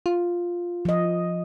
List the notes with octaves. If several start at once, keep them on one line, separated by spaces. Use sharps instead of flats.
F4
F3 D#5